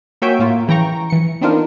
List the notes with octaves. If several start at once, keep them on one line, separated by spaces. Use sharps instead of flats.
A#3 F#4 C#5 E5 G5 G#5
A2 A#3 F4
C#3 E3 G5 A#5 C#6
E3 C#7
B3 C4 D4 D#4 F4 A#4